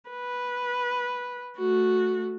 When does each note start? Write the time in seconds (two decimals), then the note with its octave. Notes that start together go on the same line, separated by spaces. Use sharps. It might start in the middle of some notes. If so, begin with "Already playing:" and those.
0.10 B4
1.58 A3 F#4